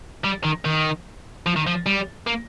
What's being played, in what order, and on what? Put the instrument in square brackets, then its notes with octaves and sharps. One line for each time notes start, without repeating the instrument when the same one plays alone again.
[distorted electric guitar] G3
D#3
D#3
F3
D#3
F3
G3
A#3